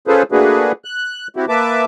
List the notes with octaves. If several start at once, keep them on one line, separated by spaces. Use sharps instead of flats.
C#4 F4 G#4 A4 B4 C5
A3 A#3 D4 F#4 G#4 B4
F#6
C4 E4 F#4 G4
A#3 B4 E5 A5 D6